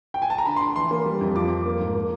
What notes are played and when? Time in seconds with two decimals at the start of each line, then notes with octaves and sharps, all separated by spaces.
0.14 G5
0.22 G#5
0.30 A5
0.38 A#5
0.46 D3 B5
0.56 C6
0.61 D3 B5
0.76 E3 C6
0.91 A#3
1.06 G3
1.21 F2
1.35 F3 D6
1.50 F3
1.66 A#3
1.80 G#2
1.95 A#3